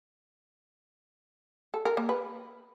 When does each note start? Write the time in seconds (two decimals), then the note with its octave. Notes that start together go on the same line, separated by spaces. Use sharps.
1.74 A4
1.85 A#4
1.97 A#3
2.09 B4